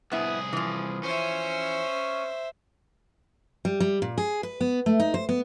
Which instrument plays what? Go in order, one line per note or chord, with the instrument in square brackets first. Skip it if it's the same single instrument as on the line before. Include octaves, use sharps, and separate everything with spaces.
[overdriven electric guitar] C2 G#4 [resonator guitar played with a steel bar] B3 E4
[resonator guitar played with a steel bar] E3 F3
[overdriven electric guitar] C#4 [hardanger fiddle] C5 E5
[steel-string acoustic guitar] G3
G3
A#2
G#4
B4
B3
A3
D#4
C5
B3